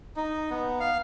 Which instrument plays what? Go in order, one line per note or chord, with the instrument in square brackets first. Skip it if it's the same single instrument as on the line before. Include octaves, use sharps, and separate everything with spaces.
[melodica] D#4
B3
F5